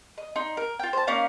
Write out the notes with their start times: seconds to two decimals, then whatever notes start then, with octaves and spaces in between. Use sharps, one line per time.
0.18 D#5
0.36 D#4 C6
0.57 A#4
0.79 F4 G5
0.93 C5 A5
1.07 A#3 C#4 D#4 F5